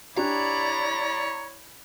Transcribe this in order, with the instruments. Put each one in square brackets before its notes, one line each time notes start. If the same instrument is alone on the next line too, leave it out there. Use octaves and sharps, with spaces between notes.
[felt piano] D4 G4 [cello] E4 D5 [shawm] C#5 [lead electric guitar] A#5